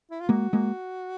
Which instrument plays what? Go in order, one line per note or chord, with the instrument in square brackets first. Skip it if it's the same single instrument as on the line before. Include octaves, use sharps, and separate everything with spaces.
[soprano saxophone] E4
F4
[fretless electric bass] G#3 A#3 [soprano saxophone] F#4
[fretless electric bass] G#3 A#3